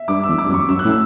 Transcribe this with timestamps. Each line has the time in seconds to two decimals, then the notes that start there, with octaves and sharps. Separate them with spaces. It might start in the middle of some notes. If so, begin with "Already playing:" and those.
Already playing: E5
0.08 G2 D6
0.24 E2 E6
0.38 D6
0.44 G2
0.49 F#2
0.54 C#6
0.69 F#2 E6
0.79 F#6
0.85 A2
0.90 E6